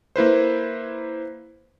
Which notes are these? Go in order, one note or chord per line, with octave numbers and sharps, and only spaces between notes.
A#3 E4 B4 C5